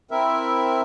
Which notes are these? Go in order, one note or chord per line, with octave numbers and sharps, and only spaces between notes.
C4 E4 A#4 E5